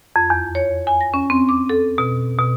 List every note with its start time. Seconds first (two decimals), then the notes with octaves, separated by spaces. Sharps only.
0.16 F2
0.30 E2
0.55 C#5
0.87 G#5
1.01 A#6
1.14 C#4
1.30 C4
1.49 D6
1.69 A4
1.98 B2
2.38 B2